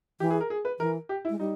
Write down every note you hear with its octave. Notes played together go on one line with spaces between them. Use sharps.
E3 G4
G#4
A#4
G#4
B4
E3 A#4
G4
E4
G#3
G3 D#4